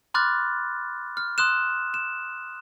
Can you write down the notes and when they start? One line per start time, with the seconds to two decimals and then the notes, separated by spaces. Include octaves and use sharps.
0.14 B5 C6 D6 F6 F#6 A6
1.17 F6
1.38 C6 D#6 F#6 E7
1.94 E7